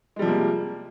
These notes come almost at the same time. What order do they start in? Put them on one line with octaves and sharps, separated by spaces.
G#3 G3 F3 C3 A#3